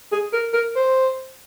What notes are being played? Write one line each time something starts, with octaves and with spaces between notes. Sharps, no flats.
G#4
A#4
A#4
C5